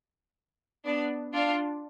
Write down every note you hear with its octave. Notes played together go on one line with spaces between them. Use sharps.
B3 D4
D4 F4